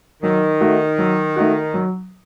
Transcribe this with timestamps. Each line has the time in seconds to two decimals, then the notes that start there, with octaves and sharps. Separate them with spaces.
0.23 D#3 F#3
0.61 A3 D#4 F#4
0.98 F#3
1.36 A3 D#4 F#4
1.74 F#3